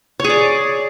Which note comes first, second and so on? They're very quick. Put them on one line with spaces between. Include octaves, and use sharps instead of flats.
C#5 G#4 D5